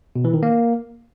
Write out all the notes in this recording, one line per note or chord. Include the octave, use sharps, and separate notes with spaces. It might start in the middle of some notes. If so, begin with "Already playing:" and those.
B2
E3
D#3
A#3